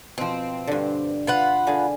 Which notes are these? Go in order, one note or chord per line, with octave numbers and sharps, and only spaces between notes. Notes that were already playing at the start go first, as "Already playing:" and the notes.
B2 F3 C4
G2 D3
F4 B4 F#5
D3 G#4 F5